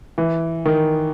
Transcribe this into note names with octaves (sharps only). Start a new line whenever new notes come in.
E3
D#3